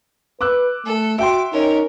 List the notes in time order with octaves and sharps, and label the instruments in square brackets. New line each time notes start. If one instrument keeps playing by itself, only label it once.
[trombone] B4 [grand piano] D6 E6 F#6
[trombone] A3 [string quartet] A4
[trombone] F#4 [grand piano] E5 G5 C6 [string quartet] D6
[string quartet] C#4 A#4 [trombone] D#4